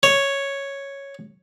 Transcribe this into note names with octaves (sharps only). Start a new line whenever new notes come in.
C#5